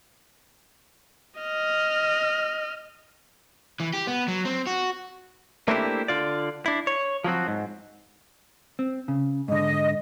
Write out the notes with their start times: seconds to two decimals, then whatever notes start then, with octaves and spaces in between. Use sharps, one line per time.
1.40 D#5 F6
3.80 E3
3.94 G4
4.07 B3
4.28 F#3
4.45 C4
4.67 F#4
5.68 A3 A#3 C4 D4 E4 G4
6.08 D3 F4 D5
6.66 D4 E4
6.87 C#5
7.24 F3 F#3 C4 F#4
7.48 G#2
8.79 C4
9.08 C#3
9.48 G#2 D3 D#5